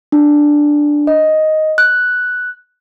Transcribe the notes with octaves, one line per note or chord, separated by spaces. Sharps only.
D4
D#5
F#6